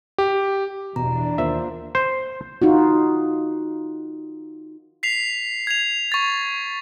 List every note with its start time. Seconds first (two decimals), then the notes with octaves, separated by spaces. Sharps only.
0.18 G4
0.96 E2 B2 D4 A#5
1.38 D#2 A#3 F4 C5 E5
1.95 C5
2.62 D#4 F4 F#4
5.03 B6 C7 F7
5.67 G#6 F7
6.12 C#6 A6